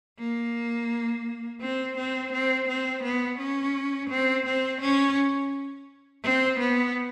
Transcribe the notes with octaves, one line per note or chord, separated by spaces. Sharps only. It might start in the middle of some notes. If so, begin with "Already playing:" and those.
A#3
C4
C4
C4
C4
B3
C#4
C4
C4
C#4
C4
B3